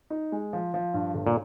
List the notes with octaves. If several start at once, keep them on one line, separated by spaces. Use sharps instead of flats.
D#4
G#3
F3
F3
G2
G1
A#2